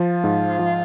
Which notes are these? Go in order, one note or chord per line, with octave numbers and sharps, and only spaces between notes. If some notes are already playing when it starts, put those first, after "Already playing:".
Already playing: F3 F4
G#2
F3